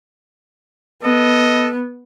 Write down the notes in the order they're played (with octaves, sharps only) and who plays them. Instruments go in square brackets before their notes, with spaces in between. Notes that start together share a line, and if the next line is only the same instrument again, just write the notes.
[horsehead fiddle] B3 [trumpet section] A4 D#5